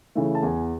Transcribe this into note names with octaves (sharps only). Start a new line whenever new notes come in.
C#3 E3 A3
A5
E2 G#5